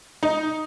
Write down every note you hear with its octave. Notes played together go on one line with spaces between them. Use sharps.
D#4